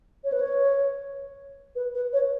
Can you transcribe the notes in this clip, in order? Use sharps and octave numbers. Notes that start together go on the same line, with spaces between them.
C#5
B4
C#5
B4
B4
C#5